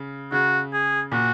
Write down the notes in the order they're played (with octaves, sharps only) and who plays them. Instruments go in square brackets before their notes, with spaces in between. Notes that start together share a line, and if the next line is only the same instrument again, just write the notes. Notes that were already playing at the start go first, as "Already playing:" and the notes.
Already playing: [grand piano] C#3
[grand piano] C#3 [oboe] F#4
[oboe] G#4
[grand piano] A#2 [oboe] F#4